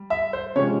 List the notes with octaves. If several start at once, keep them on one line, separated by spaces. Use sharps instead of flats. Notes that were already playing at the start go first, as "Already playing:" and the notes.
Already playing: G3
E5
C5
C3 F3 G#3 C#4 C#5